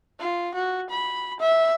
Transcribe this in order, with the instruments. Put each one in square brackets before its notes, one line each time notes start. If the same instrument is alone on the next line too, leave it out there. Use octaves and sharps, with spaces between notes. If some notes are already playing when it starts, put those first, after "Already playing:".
[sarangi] F4
F#4
B5
E5